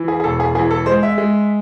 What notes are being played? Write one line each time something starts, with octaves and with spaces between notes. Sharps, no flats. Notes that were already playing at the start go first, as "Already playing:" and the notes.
Already playing: E3
G#4
G#4
E1 A4
G#4
E3 G#4
A4
G#3 C5
E5
G#3